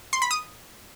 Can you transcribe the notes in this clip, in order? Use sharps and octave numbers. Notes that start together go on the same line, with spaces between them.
C6
B5
D#6